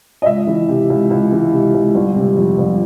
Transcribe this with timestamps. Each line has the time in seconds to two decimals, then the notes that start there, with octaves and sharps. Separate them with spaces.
0.22 D#5
0.26 C#2 E5
0.47 E3
0.69 C3
0.90 C#2
1.11 C#2
1.32 E3
1.53 C3
1.74 C#2
1.95 G1
2.16 C3
2.37 F2
2.58 G1